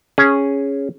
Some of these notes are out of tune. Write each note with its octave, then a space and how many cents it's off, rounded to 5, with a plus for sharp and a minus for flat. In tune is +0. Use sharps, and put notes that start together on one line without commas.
C#4 +0 G#4 +0